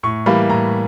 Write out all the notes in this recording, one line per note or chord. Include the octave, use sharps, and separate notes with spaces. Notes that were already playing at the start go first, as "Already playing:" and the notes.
A2 C#6
E3 G3 A#3 B5
A2 A#5